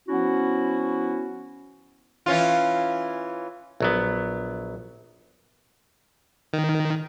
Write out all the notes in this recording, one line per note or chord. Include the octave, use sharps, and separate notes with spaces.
F3 B3 C#4 E4 F#4
E3 C#4 F4
A#1 F#3 B3
D#3